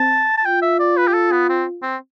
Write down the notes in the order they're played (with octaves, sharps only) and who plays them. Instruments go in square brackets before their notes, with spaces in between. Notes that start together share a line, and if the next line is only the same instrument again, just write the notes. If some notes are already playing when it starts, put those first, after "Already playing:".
Already playing: [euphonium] C4 [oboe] A5
[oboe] A5
[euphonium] F4 [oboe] G5
[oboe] E5
D5
B4
G4
A4
B3
C4
C4